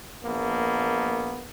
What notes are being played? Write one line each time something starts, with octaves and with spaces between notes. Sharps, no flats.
A#1 A#3 B3